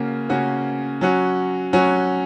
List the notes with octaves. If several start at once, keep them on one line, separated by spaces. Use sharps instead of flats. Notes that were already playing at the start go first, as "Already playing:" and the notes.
Already playing: C#3 A#3 C#4 F#4
C#3 A#3 C#4 F#4
F#3 C#4 F#4
F#3 C#4 F#4